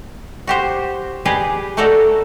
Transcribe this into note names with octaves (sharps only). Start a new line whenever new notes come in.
F#4 G4 C5
G4 G#4 B4 D5 D#5
A3 D#4 F#4 A4 A#4 D5